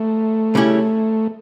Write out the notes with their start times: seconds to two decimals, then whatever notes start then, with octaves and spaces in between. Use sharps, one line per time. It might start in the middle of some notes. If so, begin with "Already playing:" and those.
Already playing: A3
0.55 C#3 G3 C#4 E4